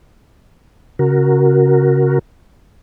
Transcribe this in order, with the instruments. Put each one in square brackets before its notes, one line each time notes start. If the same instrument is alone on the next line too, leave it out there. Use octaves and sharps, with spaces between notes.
[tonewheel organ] C#3 F#4 A#4